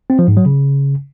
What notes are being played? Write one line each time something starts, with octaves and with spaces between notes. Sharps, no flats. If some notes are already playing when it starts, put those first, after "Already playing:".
C4
F3
G#2
F#3
C#3